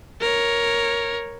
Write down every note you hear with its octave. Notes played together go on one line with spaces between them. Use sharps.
A#4 C#5